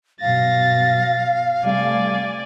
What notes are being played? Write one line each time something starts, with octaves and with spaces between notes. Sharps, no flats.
G2 B2 F#3 F5 A6 A#6
C3 G3 A3 D5 G#5